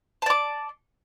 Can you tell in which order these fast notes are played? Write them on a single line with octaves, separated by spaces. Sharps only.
A5 D5 D6